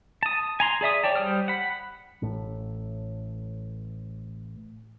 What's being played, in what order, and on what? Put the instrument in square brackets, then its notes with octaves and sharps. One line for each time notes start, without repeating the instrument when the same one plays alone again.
[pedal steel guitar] A5 D#6
G#5 A#5 C6
G#4 D5 E5 D#6
C#5 D5 G5 A5
G3 C5 G5 D#6 F6
F#5 B5
[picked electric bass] A1 A2